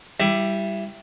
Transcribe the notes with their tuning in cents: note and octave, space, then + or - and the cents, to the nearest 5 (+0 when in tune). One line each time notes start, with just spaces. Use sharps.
G3 +0 E4 +20 D5 +5